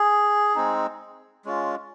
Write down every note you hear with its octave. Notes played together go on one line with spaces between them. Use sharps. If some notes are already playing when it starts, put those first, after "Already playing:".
Already playing: G#4
G#3 C4 D#4
G#3 C#4 F4